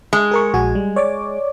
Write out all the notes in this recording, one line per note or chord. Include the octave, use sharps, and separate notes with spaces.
G#3
G#4 A#4 C#6
A#1 F#4 G#5
G3
C#5 D5 D6